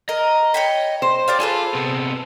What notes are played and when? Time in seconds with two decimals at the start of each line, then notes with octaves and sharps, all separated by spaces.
0.09 A#4 D#5
0.54 C#5 G5 B5
1.02 C5
1.28 G4 D5 F5
1.40 F4 G#4 A4 B4
1.74 C3 B3